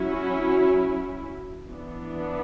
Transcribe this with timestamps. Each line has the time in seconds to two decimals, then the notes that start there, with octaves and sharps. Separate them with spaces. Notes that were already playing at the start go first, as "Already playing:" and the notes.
Already playing: F#3 C#4 E4
0.10 F#4
1.69 E3 B3 D4